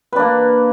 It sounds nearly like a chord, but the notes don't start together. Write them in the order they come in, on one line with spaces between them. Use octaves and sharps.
B4 D4 A#3